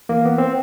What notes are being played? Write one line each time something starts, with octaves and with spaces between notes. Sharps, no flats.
E3 A#3
B3
C4